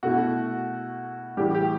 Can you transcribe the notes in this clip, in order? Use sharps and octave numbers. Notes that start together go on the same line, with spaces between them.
B2 A3 E4 F#4
A2 E3 G3 G4
G4